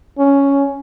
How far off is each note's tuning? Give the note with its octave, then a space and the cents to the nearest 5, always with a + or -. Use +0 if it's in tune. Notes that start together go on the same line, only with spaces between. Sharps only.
C#4 +5